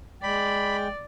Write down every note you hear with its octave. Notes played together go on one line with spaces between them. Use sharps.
G#3 D5 G5 B5